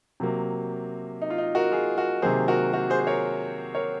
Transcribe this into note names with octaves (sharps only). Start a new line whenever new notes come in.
C3 F#3 A#3
D#4
F4
D#4
F#4 A#4
F4 G#4
F#4 A#4
C3 D#3 F#3 A#3 G#4 C5
F#4 A#4
F#4 A#4
G#4 C5
C5
A#4 C#5
A#4 C#5